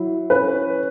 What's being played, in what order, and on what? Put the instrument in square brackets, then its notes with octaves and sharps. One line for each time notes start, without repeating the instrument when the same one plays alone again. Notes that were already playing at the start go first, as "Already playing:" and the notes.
Already playing: [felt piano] F#3 E4
[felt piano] C#4 [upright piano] B4